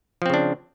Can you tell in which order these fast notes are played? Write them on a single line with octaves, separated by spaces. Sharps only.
F3 C4 C#3 D4